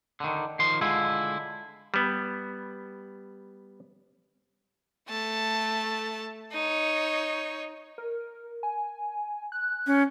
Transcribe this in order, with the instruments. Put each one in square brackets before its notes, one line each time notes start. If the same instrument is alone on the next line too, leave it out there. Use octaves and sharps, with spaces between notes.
[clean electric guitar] D3 D#3
D#3 F3 C6
D3 G#3 E4 F4
[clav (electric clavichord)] G3 B3
[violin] A3 A5
D#4 C#5
[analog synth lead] A#4
G#5
F#6
[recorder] C#4